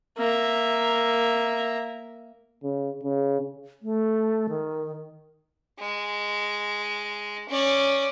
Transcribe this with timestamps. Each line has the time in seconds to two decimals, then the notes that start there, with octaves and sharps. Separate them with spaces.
0.17 A#3 E5
2.64 C#3
3.03 C#3
3.82 A3
4.49 D#3
5.80 G#3
7.49 C#4 D5